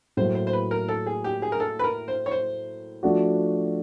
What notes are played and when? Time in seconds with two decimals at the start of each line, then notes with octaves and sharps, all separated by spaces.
0.17 A2 F#3 A#3 C5
0.35 C5
0.47 C5
0.53 B4
0.71 A#4
0.89 A4
1.06 G#4
1.24 G4
1.42 G#4
1.52 A#4
1.60 A4
1.79 B4
1.84 A#4
2.08 C5
2.26 C#5
2.31 C5
3.03 F3 A3 D4 F#4